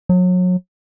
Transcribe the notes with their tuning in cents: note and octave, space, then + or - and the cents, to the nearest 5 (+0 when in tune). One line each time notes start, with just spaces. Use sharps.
F#3 -30